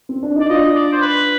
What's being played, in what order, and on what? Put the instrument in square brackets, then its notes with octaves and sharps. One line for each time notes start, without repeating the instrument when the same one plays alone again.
[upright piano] C4
D4
[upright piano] D#4 [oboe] D5
[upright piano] D4 F4 [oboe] D#5
[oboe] D5
C5
B4